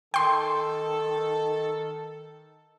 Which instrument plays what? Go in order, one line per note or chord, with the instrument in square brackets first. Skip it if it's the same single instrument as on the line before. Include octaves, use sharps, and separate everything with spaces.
[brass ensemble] D#3 A4 [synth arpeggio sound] G5 C6